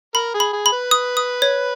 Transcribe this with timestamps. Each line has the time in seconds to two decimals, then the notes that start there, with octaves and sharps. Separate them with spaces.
0.15 A#4 B5
0.34 G#4
0.40 B5
0.53 G#4
0.66 B5
0.72 B4
0.91 D#6
1.17 D#6
1.42 C#5